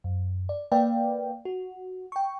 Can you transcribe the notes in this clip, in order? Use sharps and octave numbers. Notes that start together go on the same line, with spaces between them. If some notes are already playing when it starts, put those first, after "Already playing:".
F#2
D5
A#3 B4 D5 F5 G5
F#4
G5 C#6